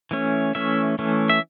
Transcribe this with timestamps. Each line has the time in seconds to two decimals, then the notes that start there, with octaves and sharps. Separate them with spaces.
0.11 E3 A3 C#4
0.55 E3 A3 C#4 E5
0.99 E3 A3 C#4
1.30 E5